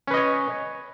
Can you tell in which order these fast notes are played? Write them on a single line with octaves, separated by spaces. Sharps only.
C#4 B4 D#5 C#5